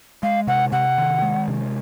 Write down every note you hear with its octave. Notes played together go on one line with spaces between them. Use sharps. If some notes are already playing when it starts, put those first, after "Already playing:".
G#3 F5
C3 F#5
C3 F#5
D#3
G#3
C3